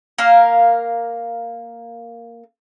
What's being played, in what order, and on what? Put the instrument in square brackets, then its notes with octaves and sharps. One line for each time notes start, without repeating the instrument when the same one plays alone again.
[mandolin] A#3 A#4 F5